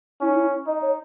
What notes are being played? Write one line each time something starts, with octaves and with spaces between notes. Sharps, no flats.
C#4 E4
D#4
E4
D#4 D#5
C#5